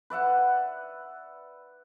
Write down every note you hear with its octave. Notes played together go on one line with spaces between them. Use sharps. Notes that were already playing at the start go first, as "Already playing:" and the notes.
B4 D5 E5 F#5